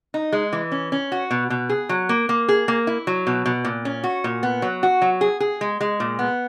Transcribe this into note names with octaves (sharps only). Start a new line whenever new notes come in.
D#4
G#3
E3
C#4
C#4
F#4
B2
B2
G#4
F#3
A#3
A#3
G#4
A#3
E4
F#3
B2
B2
A#2
C#4
F#4
A#2
B3
F#3
F#4
F#3
G#4
G#4
G#3
G#3
A#2
B3